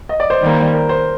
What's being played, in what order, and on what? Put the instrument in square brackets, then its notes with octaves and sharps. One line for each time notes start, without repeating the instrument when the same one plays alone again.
[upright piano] D#5
D5
C5
[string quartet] D#3 G3 A#3
[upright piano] A#4
C5